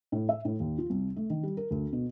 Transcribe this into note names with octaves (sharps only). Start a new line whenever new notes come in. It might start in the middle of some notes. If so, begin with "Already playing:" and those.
A2
E5
A2
D#2
F4
C2
A3
D#3
G3
A#4
D2
B2